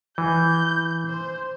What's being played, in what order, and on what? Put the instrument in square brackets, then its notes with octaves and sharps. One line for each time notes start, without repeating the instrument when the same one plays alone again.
[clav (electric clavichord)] E3 [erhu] G6
[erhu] C5